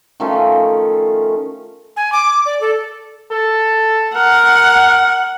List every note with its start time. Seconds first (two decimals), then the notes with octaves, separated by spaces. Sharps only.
0.20 D#3 F3 A3 C#4
1.97 G#5
2.12 D6
2.46 D5
2.61 A4
3.31 A4
4.15 A#4 F#5